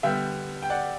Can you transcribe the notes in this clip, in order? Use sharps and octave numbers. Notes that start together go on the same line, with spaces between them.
D3 G3 B3 E5 G5
G5
D5 F#5